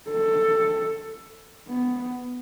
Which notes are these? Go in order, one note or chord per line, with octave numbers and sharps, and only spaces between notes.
A4
B3